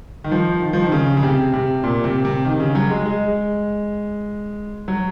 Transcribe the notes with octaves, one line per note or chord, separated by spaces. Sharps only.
D#3
F3
D#3
F3
D#3
C#3
C#3
C3
C3
A#2
C3
C3
D#3
C#3
F#3
G#3
G#3
F#3